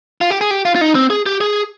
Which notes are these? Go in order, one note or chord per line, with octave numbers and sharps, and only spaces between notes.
F4
G4
G#4
G4
F4
F4
D#4
C4
G#4
G4
G#4